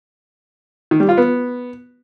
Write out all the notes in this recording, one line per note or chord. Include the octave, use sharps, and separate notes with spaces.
D#3
G3
F4
B3